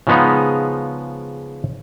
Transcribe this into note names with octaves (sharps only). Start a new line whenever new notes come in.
C#3 F3 G#3 B3 D#4